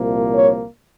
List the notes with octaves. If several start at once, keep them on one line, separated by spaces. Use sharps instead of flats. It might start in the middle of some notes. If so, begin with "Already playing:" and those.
Already playing: C2 A#2 F3 A#3
C#5